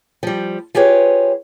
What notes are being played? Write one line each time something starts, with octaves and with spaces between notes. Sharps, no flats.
F3 G3
F4 G4 G#4 B4 C#5